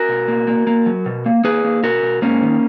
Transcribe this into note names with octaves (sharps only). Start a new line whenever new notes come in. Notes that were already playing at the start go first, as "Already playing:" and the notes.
Already playing: F#4 A#4
B2
A#3
A#3
A#3
F#3
B2
A#3
A#3 G#4 B4
A#3
B2 F#4 A#4
B2
G#2 A#3 C#4
D#3